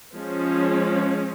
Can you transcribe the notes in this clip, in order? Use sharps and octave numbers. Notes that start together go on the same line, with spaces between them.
F3 G#3 C#4